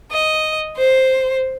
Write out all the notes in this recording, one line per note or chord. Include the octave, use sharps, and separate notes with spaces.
D#5
C5